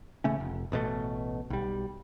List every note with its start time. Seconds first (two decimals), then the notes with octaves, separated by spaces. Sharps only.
0.24 A1 C#3 A3 C#4
0.40 F1
0.72 A1 B2 F3 A3
1.50 B1 G3